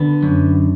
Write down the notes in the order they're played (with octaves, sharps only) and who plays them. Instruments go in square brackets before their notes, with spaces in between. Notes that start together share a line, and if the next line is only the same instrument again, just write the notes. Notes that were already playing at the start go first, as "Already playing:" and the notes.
Already playing: [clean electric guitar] D3 B3
F#2